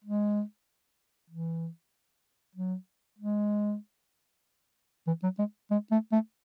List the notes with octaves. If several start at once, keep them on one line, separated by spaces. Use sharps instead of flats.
G#3
E3
F#3
G#3
E3
F#3
G#3
G#3
A3
A3